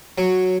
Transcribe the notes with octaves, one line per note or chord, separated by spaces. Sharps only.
F#3